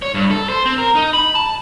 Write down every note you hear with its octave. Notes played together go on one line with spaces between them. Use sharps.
C#5
G2
A4
C5
C4
A#4
D#4
B5
A5